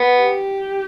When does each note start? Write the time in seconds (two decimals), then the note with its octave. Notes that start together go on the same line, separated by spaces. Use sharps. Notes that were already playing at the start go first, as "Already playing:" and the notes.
Already playing: B3
0.21 G4